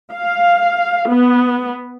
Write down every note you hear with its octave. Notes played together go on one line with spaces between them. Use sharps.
F5
B3